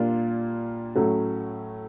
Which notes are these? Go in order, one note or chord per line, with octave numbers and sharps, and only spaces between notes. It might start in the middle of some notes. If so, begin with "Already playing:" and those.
Already playing: A#2 G3 A#3 D4 F4
A2 F#3 A3 C#4 F#4